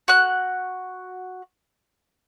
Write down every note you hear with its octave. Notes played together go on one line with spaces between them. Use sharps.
F#4 F#6